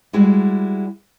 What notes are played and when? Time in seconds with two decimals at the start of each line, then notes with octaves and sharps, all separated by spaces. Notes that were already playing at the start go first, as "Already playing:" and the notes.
0.13 G3 G#3 E4 F#4